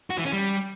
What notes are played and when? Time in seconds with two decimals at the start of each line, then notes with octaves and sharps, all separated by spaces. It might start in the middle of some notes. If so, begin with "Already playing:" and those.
0.10 F#4
0.18 E3
0.25 C#4
0.33 G3